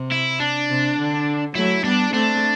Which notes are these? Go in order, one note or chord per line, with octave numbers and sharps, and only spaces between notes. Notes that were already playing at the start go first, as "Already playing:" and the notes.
Already playing: C3
E4
D4
C3
D3
F#3 A3 E4
G3 B3 D4
A3 C4 D4